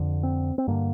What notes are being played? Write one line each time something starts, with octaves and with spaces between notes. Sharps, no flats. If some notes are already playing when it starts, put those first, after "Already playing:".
Already playing: F2 D3
C4
C4
G2 D3 A#3